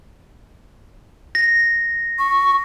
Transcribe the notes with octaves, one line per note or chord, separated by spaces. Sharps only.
A#6
C#6